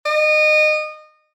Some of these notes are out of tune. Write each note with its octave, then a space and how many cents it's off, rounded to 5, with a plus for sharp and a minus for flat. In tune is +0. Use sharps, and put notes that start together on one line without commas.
D#5 -25